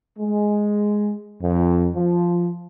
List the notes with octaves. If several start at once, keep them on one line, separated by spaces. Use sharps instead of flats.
G#3
F2
F3